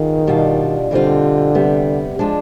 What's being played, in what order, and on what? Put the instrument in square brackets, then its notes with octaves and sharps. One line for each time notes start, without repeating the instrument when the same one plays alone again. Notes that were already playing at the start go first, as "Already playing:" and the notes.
Already playing: [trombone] D#3 [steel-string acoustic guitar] B3 F4 G#4
[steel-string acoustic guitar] B2 G3 D4 F4
[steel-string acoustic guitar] B2 G3 C4 F4 [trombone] D3
[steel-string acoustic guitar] C3 G3 B3
F3 G#3 D4